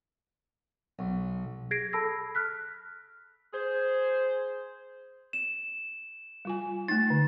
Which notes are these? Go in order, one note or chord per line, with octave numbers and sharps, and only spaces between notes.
B1
G#4 G#6 A#6 C7 D7
A4 A5 B5 E6 A#6
F6 F#6 B6
G#4 C5
E7
G3 F4 G#5
A3 D#4 A6
D3